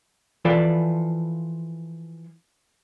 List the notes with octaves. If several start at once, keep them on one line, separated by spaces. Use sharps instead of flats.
E3 F3 F4 A4 B4 D5